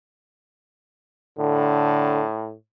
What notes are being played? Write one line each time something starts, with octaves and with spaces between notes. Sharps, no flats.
A2 D3